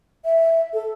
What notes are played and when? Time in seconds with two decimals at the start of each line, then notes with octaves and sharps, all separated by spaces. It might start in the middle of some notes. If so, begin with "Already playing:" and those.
0.25 E5
0.73 A4